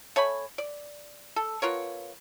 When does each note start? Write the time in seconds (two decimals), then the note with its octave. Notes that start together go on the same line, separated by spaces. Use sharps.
0.16 A3 C#5 G#5 B5
0.58 D5
1.36 A4
1.62 B3 F4 A#4 C#5